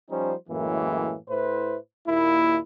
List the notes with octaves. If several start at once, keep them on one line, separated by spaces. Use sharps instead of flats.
F3 G3 C#4 D#4 C5
F#2 A2 E3 G#3 A#3
A2 E4 B4 C5
D#2 A#2 A#3 E4